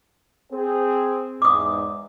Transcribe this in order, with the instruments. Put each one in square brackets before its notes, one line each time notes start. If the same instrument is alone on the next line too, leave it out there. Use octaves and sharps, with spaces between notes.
[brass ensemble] C4 G#4
[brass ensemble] E2 G#2 [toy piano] D6 D#6